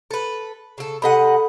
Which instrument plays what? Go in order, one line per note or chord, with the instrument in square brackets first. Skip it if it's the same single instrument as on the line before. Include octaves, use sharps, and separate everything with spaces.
[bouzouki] A4 B4
C#3 A4
[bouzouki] C3 D#5 F#5 [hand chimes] A4 B5